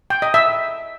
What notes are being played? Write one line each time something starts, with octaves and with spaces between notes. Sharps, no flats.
G5
D#5
E5